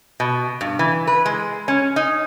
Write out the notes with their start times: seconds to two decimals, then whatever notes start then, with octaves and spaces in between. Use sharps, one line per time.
0.20 B2
0.61 G2
0.79 E3
1.07 B4
1.26 G#3
1.68 C#4
1.96 D#4